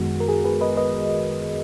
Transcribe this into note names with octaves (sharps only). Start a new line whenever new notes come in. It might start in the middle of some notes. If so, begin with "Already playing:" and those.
Already playing: F#2 D#3 G#3 B3 F#4
A#4
G#4
G#4 B4
B4 D#5
B4 D#5